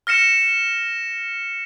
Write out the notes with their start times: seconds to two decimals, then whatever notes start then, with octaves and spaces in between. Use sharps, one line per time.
0.07 F6 A#6 C#7 E7